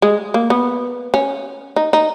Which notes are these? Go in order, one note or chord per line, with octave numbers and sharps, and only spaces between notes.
G#3
A#3
B3
C#4
D#4
D#4